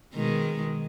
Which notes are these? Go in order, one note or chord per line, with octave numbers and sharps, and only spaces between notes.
B2 D#3 G#3